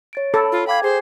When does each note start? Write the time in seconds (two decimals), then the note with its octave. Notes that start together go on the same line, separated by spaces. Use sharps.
0.13 C#5 A6 D7
0.34 A4 B5
0.52 F4
0.67 F5 G5 B5 D6 G#6
0.83 G#4 C5 G#5 C7